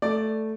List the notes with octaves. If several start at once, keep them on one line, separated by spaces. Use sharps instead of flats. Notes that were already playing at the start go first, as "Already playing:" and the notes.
A3 D5